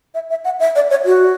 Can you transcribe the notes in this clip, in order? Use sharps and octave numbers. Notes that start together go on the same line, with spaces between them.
E5
E5
F#5
E5
D5
C#5
F#4